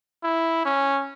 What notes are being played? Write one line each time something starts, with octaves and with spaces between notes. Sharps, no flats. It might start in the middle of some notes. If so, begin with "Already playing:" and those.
E4
C#4